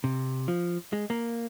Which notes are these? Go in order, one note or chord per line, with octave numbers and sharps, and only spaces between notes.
C3
F3
G#3
A#3